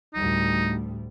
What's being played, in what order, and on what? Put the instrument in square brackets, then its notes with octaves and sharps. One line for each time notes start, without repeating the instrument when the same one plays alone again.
[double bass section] D2 A2 G3 [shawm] D#4